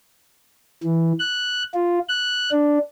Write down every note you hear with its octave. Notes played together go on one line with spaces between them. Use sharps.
E3
F#6
F4
F#6
D4